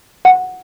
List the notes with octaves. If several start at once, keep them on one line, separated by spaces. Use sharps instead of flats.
F#5